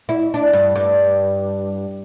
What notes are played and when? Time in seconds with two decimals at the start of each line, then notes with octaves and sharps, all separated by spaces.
0.09 E4
0.34 D4
0.53 G2
0.76 G2